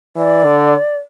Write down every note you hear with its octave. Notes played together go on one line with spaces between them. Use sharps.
E3 D5
D3